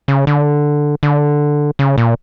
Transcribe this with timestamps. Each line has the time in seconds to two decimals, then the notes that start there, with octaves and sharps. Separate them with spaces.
0.08 C#3
0.27 D3
1.03 D3
1.79 C#3
1.98 A#2